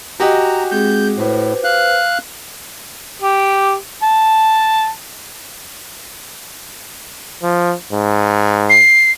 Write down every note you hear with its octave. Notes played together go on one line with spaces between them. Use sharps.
F#4 G4 D#5 G#5 A#5
G#3 C4 G#4 G6
A2 B4 C5
F5 F#6
G4
A5
F3
G#2
C7